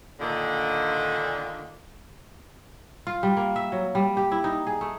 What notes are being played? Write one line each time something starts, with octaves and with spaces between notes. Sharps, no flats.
A#2 D3 D#3
F4
G3
A#3
E5
F#3
G3
G4
E4
D#4
G#4
A3